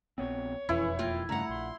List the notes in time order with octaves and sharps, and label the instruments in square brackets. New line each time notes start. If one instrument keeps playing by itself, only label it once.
[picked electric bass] A#1 B3 C4 [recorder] C#5
[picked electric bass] E1 F2 [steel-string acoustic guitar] E3 C#4 B4 [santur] E4
[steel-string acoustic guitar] A#3 F4 G5
[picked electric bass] G2 C#3 [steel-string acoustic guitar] A3 F#5 [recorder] A#5
[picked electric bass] A#1 [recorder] C6